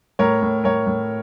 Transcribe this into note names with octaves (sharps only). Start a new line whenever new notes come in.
A2 A#4 C#5
A2
A2 A#4 C#5
A2